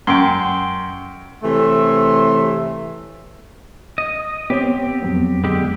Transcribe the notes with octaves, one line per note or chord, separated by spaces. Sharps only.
F#2 G5 C6
C3 E3 A3 C#5 E5 C6
D#5
B3 C4 G4 C#5
F2 F#3 B3
D3 G#3 G4